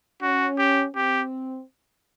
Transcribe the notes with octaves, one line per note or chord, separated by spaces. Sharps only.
C#4 F#4
G4
C4 G4